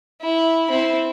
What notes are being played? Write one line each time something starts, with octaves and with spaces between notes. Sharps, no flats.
E4
C4 E4